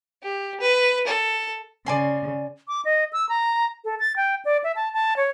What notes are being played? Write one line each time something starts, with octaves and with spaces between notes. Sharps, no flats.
G4
B4
A4
C#3 D5 G#5 C6
D6
D#5
E6
A#5
A4
A6
G5
D5
E5
A5
A5
C#5